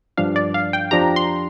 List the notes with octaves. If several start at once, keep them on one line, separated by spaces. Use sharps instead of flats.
G2 F3 D4 F5
D5
F5
G5
F2 F3 D4 G4 A#5
C6